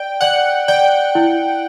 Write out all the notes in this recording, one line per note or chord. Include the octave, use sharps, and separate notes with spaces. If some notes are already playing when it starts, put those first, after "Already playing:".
Already playing: D5 G5
D5 F#5
D5 G5
E4